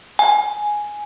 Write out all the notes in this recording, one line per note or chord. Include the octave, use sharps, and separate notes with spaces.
G#5